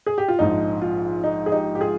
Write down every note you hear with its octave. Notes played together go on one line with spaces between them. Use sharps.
G#4
G4
F4
A#1 G#2 F3 D#4
F4
D#4
G#4
D#4 G4
G4
F4 G#4